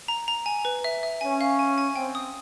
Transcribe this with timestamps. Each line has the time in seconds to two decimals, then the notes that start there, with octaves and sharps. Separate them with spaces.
0.08 A#5
0.28 A#5
0.46 G#5
0.65 B4
0.84 E5
1.03 E5
1.21 C#4 G#5
1.41 F5
1.59 G#5
1.78 G#5
1.96 C4 G5
2.15 D#6